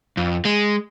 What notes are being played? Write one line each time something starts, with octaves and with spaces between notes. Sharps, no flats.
F2
G#3